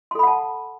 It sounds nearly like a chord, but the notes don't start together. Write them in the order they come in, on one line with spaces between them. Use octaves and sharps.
C6 A4 B5 F#5 A5